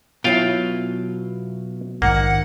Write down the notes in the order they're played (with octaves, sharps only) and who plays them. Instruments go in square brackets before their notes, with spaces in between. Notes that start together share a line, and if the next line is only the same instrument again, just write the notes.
[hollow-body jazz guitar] B2 F#3 E4 [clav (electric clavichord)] F4 F5 G5
[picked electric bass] A#1 G#2 D#3 [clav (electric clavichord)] A#3 [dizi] F#5